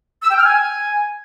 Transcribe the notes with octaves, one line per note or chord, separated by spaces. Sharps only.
E6
G5
F6
G#5